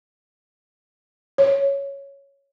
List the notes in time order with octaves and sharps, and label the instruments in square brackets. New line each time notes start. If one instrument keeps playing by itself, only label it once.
[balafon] C#5